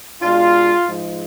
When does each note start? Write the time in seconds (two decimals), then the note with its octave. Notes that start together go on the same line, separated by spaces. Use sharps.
0.22 B2 G#3 D4 F4
0.85 G#2 F3 G#3